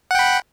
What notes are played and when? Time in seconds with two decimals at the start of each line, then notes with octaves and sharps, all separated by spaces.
0.11 F#5
0.15 G5
0.19 B5